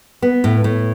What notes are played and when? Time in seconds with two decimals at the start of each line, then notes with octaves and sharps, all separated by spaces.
0.22 B3
0.44 A2
0.64 A2